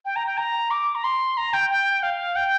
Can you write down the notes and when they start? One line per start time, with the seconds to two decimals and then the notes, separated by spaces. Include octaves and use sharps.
0.05 G5
0.16 A#5
0.26 G5
0.37 A#5
0.71 D6
0.95 A#5
1.04 C6
1.37 A#5
1.53 G5
1.70 G5
2.03 F5
2.36 G5